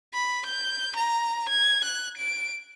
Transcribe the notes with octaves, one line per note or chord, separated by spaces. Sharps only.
B5
G6
A#5
G#6
F#6
D7